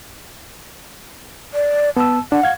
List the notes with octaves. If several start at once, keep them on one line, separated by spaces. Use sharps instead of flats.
D5
B3 A5 E6
D4 F#5
F5 G#6